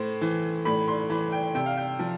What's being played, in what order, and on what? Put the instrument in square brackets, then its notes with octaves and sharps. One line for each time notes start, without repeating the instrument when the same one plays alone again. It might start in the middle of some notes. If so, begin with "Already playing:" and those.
Already playing: [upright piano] A2 C5
E3
A2 B5
C6
E3 B5
G5
C3 G5
F5
G5
F3